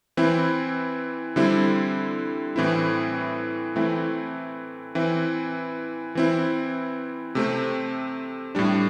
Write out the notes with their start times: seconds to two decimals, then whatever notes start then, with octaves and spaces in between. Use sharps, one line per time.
0.17 E3 C4 E4
1.36 D3 G3 C4 E4
2.56 A2 E3 C4 E4
3.76 E3 A3 C4 E4
4.95 E3 C4 E4
6.15 E3 C4 E4
7.35 C3 A3 C4
8.55 A2 G3 D4